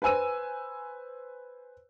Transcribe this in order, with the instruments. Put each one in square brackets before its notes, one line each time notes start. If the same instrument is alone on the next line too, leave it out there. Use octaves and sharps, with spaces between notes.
[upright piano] B4 C5 G#5 E6 D#7